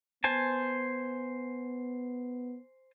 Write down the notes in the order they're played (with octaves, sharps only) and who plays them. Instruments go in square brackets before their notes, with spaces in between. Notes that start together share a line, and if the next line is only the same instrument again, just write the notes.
[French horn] B3 [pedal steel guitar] C5 G#5 A5